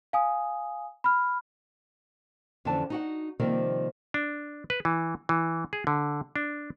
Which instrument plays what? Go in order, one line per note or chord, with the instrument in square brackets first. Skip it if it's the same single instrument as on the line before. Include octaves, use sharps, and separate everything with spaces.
[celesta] F5 G#5 D#6
B5 F6
[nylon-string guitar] F2 D3 E3 C#4 A5
D#4 F#4 F#5
C3 D#3 F3 G3 A#3 C4
[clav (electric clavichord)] D4
B4
E3
E3
G#4
D3
D4